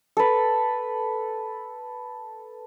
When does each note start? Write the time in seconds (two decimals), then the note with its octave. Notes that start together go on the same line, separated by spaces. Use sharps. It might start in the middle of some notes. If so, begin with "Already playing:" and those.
0.17 A4 B4